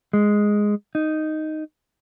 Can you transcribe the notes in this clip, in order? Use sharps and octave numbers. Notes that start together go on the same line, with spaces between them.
G#3
D#4